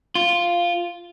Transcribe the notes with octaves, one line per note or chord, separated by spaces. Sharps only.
F4